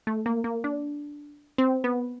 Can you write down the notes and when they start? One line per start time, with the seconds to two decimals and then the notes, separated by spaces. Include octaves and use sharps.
0.07 A3
0.26 A#3
0.44 A#3
0.64 D4
1.58 C4
1.84 B3